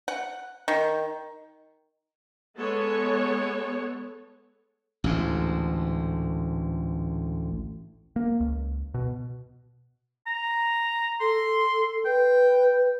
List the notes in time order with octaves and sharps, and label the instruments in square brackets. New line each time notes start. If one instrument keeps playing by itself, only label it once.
[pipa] F#5
D#3
[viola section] G#3 B3 A4 C#5
[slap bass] A1 D2 G#2
[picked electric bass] A#3
C#2
B2
[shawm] A#5
[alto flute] A4 [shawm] C6
[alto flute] B4 [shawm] G5